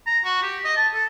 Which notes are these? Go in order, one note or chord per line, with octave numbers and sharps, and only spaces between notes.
A#5
F#4
G4
D#5
A5
A4